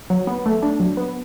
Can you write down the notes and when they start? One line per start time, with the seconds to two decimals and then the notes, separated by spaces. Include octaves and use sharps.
0.10 F#3
0.27 B3
0.46 A3
0.63 D4
0.80 F#3
0.97 B3